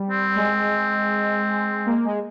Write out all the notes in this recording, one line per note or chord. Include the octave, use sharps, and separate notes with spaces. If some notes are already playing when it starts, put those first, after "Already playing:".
Already playing: G3
C4
G#3
A#3
G#3